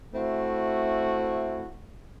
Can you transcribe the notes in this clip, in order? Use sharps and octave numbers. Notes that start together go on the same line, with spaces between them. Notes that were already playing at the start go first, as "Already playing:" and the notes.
A3 C4 E4 F#4